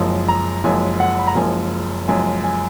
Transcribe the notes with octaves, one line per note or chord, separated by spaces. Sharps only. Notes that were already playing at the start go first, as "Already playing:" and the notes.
Already playing: F#1 F#2 F3 G#3
A#5
F#1 F#2 F3 G#3 G#5
F#5
B5
A#5
F#1 F#2 F3 G#3 G#5
F#1 F#2 F3 G#3 G#5
G#5